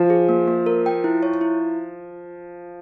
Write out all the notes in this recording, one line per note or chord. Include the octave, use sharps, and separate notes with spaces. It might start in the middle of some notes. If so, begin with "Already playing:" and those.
Already playing: F3
G#4
A#3
A#3
A#4
G5
E4
C#5
E4